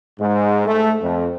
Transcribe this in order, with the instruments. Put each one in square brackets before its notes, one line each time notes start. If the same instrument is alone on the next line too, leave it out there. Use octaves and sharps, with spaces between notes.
[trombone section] G#2
A3
F2